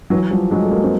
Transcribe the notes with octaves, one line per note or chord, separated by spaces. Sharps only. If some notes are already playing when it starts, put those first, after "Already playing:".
E3 F#3
F3 G3
F#3 G#3
A3
G#3 A#3
C4